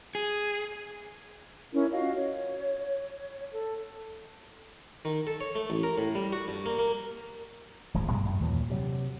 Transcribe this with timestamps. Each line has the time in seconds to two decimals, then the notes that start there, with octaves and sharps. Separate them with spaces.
0.15 G#4
1.73 C#4 D#4 E4 A#4
1.91 F4 F#4 D#5 F5
2.15 C#5
3.51 A4
5.05 D#3
5.27 A4
5.41 C#5
5.55 A3
5.70 A1
5.83 A#4
5.98 A2
6.15 G3
6.33 F#4
6.48 G2
6.66 A#3
6.79 A#3
7.94 D1 G#1 F3 G#3
8.08 G2 B2 G3 G#3
8.24 F#2
8.40 D#2 A#2 E3 F#3
8.70 C3 F#3